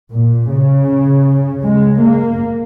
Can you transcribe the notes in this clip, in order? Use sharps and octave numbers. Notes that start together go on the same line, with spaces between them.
A#2
C#3
G#3
A#3